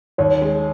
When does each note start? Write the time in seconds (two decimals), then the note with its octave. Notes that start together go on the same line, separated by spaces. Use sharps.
0.18 D#2 C#5
0.42 G#3